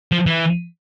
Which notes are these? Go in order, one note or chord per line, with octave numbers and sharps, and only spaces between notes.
F3
E3